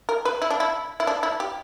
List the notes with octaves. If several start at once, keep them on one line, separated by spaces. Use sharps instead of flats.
A#4
B4
E4
D4
E4
E4
D4
E4
G4